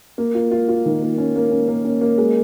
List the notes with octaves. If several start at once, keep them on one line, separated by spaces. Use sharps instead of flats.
A#3
F4
F4
F4
D#3
A#3
C#4
A#3
C#4
A#3
C#4
A#3
G#3